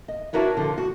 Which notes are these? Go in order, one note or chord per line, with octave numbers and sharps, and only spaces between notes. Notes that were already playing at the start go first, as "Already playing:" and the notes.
D#5
D4 E4 F#4 A#4 B4 C#5
D3 F3
F#4